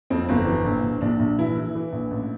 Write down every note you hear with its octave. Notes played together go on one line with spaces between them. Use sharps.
F2 C4
G1 C4
E3
A#1
A#1
A#1 D4
A#1
E3 E4
E3
E3
A#1
A1